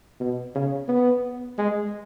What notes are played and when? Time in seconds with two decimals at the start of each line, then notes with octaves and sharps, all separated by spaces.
0.20 B2
0.55 C#3
0.88 B3
1.58 G#3